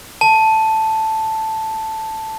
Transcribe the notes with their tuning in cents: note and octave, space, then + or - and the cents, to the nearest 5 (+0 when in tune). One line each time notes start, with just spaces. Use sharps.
A5 +0